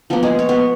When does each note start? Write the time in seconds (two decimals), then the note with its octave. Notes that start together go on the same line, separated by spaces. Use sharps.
0.10 F3 A#3 B3
0.23 G#3 G#4
0.39 C#5
0.49 B3 B4